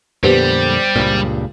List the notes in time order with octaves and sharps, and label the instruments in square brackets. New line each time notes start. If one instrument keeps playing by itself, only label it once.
[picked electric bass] F2 A#2 D3 [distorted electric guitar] G3 [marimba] B3 G4 B4 [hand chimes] C5
[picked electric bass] C#2 G2 A#2